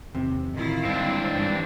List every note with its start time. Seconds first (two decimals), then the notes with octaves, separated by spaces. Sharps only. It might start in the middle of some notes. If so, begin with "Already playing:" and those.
0.15 E2 G2 C3 D#3
0.53 A2 D3 D#3 E4 F4
0.85 G1 G3 G#3 C4 D4
1.31 G2 E3